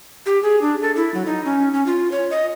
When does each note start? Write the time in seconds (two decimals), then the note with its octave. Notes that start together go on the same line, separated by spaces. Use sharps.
0.26 G4
0.43 G#4
0.62 D4
0.82 A4
0.96 E4
1.14 F#3
1.26 D#4
1.45 C#4
1.73 C#4
1.86 F4
2.12 C#5
2.31 D#5